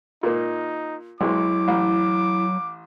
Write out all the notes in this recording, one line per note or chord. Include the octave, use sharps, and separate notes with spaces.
A#2 A#3 D#4
B1 F#3 G#3 E4 D6
A1